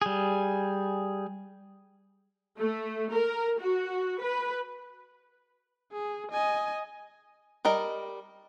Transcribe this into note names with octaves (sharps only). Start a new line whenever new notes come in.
G3 G#4
A3
A#4
F#4
B4
G#4
D#5 G#5
G3 A#4 D#5